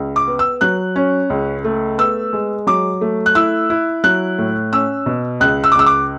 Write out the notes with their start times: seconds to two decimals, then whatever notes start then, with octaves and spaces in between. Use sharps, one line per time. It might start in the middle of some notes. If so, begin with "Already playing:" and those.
Already playing: C#2
0.16 D6
0.28 B3
0.39 E6
0.61 F#3 F#6
0.96 C#4
1.30 C#2
1.64 A3
1.98 B3 E6
2.33 G#3
2.67 F#3 D6
3.01 A3
3.26 F#6
3.35 E4 E6
3.70 E4
4.04 F#3 F#6
4.38 A2
4.73 C#4 E6
5.06 B2
5.40 C#2 F#6
5.64 E6
5.72 D6
5.75 C#2 E6
5.86 D6